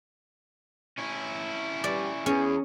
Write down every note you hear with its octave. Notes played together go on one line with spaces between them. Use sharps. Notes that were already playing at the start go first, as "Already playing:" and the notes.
C#4 E4
G3 D5
E2 C#4 G#4